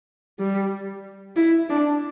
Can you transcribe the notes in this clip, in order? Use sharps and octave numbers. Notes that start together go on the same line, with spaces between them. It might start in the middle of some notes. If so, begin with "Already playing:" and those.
G3
E4
D4